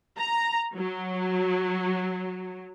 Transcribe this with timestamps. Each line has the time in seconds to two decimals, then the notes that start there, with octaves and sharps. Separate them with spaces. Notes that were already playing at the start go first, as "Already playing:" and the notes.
0.18 A#5
0.76 F#3